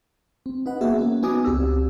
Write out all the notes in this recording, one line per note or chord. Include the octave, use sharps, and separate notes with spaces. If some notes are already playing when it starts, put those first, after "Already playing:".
C4
D#4 B4 F#5
A#3 B3 F#4 G#4 E5
A#3 C#4
B3 D#4 F#4 G#5 D6 D#6
C#2 C4 G4 E6